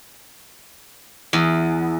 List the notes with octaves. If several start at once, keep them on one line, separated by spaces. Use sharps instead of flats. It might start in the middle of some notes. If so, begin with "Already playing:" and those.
E2